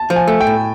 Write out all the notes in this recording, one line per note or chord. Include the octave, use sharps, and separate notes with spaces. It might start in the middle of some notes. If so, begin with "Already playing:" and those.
Already playing: A5
F3
G#5
A3
G5
A2